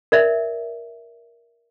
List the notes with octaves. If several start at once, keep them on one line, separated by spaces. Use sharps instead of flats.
A#4 D5 E5